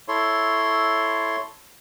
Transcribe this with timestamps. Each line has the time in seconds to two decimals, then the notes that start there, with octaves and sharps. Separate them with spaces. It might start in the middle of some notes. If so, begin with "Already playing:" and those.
0.08 E4 A4 C#5 C6